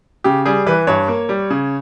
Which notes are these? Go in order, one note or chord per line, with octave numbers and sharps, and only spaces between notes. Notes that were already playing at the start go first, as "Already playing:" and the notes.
C#3 G4
G3 G#4
E3 B4
G2 C#5
A#3
G3
C#3